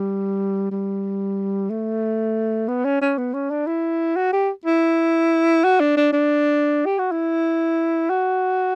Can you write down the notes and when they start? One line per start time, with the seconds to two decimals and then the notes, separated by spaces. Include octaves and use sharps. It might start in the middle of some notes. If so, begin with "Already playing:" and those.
Already playing: G3
0.71 G3
1.70 A3
2.68 B3
2.85 C#4
3.02 C#4
3.18 B3
3.34 C#4
3.51 D4
3.67 E4
4.17 F#4
4.33 G4
4.65 E4
5.64 F#4
5.80 D4
5.97 D4
6.13 D4
6.86 G4
6.99 F#4
7.12 E4
8.10 F#4